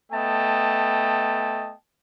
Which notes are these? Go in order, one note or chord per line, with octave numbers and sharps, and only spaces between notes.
A3 B3 D#5 G5 A5